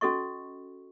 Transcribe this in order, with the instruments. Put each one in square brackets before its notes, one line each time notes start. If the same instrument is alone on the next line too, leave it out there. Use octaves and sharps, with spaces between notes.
[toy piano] C#4 F#4 A4 D#5 C#6